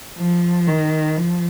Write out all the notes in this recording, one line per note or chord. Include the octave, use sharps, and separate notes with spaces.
F3
D#3
F3